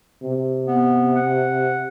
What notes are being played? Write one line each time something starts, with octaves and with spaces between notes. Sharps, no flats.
C3
B3
F#5